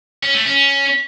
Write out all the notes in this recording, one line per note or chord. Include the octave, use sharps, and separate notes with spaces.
C#4
A3
C#4